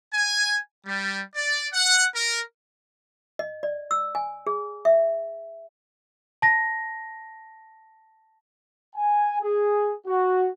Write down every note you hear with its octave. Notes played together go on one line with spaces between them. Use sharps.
G#5
G3
D5
F#5
A#4
D#5
D5
E6
G#5
G#4
E5
A5 A#6
G#5
G#4
F#4